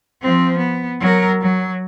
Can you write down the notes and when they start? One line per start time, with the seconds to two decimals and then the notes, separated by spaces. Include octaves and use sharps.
0.22 F3 C4
0.58 B3
1.00 F#3 A#4
1.42 F#3